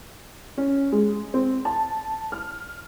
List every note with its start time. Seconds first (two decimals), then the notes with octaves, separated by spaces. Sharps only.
0.58 C#4
0.92 G#3
1.34 C4
1.65 A5
2.32 F6